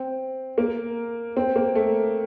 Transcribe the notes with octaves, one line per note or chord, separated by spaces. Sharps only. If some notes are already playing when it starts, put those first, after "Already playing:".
Already playing: C4
A#3
C4
A#3
A3